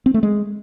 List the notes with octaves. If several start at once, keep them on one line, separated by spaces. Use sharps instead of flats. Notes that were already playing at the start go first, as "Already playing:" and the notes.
C4
A3
G#3